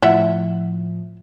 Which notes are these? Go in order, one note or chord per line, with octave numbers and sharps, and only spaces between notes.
A2 F3 E4 E5 F#5